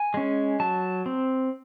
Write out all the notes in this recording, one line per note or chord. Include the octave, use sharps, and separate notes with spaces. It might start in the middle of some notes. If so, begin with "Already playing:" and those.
Already playing: G#5
G#3 C#4
F#3 A5
C4